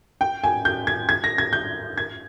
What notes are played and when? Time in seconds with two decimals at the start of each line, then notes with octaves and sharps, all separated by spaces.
0.21 G5
0.44 G#5
0.65 G6
0.87 G#6
1.09 G#6
1.24 A#6
1.38 G#6
1.53 G6
1.97 G#6